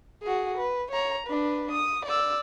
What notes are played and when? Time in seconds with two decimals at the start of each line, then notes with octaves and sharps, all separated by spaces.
0.23 F#4 G#4
0.58 B4
0.92 C#5 A#5
1.27 D4 B4
1.71 D#6
2.06 D5 E6